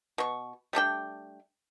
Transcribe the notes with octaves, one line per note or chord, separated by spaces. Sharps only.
B2 C#6
G3 A3 D4 G5